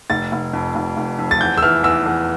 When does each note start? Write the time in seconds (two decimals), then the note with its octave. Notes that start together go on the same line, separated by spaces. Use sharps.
0.10 F1 A6
0.32 F1
0.53 F2
0.75 F1
0.97 F1
1.19 F2
1.31 A6
1.40 E2 G6
1.58 E6
1.62 E3 F6
1.84 E2 E6
2.06 E2